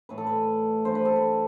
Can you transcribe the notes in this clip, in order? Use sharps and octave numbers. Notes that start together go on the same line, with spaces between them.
A2 E3 A3 B4
A4
B4
G2 E3 G3 C5
B4
A4
B4